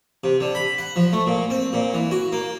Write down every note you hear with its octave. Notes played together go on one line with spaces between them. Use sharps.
C3
D3
B5
F#5
F3
A3
A#2
C4
A#2
E3
F#4
A#3